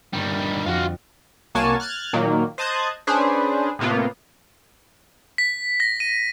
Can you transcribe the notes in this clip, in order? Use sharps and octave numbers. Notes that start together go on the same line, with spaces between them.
G1 D#3 G3 B3
F2 F#4 F5 A6 D7
C2 A#3 F#4 C#5 G#5 A5
F6 F#6 G#6 A6
A#2 D#3 F#3 A#3
C5 D#5 A5 D#6 F#6 G#6
C#4 D4 G#4 B4 C5
A2 C3 A#3 B3 F4
B6
A#6
D#7